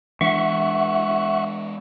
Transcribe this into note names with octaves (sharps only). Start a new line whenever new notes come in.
E3 G#3 D4 E5 F#5 C#6